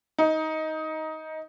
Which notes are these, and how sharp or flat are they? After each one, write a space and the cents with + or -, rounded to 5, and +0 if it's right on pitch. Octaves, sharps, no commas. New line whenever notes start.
D#4 +15